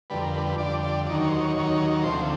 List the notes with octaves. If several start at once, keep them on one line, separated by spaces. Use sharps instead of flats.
F2 D3 G3 B4
A#4
B4
B4
F2 D3 G3 D5
D5
D#2 D#3 F#3 D5
C#5
C5
C#5
D#2 D#3 F#3
D2 C3 F3 C5